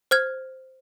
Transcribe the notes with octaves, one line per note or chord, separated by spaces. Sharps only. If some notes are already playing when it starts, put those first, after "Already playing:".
C5 F6 G#6